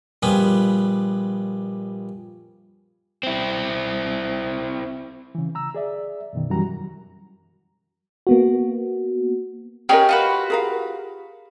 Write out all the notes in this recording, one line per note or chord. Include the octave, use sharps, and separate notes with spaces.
A#1 G3 B3 F4 G#4 B5
C4 E4
C#3 E3
A#5 E6
G#4 D5 E5
F#2 B2 D#3
F#2 E3 G3 F#4 A#5
A#3 B3 F#4
C#4 G4 G#4 A#4 C#5 D#5 G5
F4 F#4 B4
G#4 A#4 F5